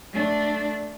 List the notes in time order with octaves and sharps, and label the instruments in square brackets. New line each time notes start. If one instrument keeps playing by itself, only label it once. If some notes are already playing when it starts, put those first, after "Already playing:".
[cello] A3 D4